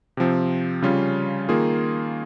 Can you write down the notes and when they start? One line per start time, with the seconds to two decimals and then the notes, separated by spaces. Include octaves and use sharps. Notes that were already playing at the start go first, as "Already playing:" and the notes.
0.17 C3 F3 C4
0.82 C#3 G3 C#4 F4
1.49 D#3 A#3 F4 G#4